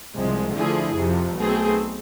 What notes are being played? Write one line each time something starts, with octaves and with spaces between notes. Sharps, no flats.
C2 C3 F3 G#3
D3 F3 A3 E4 G#4
F2 C3 F3
B1 B2 A3 C4 G#4